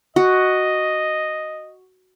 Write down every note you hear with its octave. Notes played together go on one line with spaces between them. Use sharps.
F#4 D#5